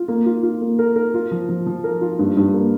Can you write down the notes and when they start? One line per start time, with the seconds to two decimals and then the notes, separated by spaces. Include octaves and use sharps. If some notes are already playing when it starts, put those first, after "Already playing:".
Already playing: F4
0.08 A#3
0.26 F4
0.43 F4
0.61 A#3
0.79 A#4
0.96 A#4
1.14 F4
1.31 F3
1.49 F3
1.66 F3
1.84 A#4
2.01 F4
2.19 G2
2.37 G2
2.54 A#3